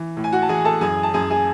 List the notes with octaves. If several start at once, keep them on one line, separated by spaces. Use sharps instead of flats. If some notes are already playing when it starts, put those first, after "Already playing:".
Already playing: E3
A2
G#5
F#4 F#5
A5
E3 G#4 G#5
A4 A5
F#2 G#4 G#5
A5
F#2 G#4 G#5
G#4 G#5